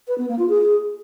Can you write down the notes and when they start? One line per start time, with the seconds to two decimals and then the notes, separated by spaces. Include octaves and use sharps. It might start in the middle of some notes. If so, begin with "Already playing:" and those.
0.07 B4
0.18 B3
0.28 A#3
0.38 F4
0.49 G#4